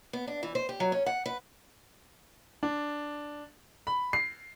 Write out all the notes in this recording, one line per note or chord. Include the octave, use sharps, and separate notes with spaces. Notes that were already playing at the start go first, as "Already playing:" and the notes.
B3
D4
E3
C5
G4
F#3
C#4
F#5
B4
D4
B5
C7